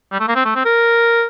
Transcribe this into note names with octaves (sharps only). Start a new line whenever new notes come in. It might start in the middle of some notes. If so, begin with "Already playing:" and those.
G3
A3
A#3
C4
A3
C4
A#4